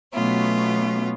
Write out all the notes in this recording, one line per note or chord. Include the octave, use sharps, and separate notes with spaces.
B2 F#3 A3 B3 C#4 F4